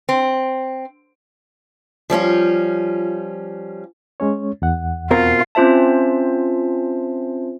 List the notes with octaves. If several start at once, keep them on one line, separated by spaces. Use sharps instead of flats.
C4
F3 G3 C#4 F4
G#3 C#4 C#5
E2 F#5
B2 C4 F4 A#4
C4 C#4 F4 C5 E5 A5